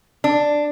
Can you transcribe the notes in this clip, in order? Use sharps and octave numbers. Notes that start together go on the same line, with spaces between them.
D4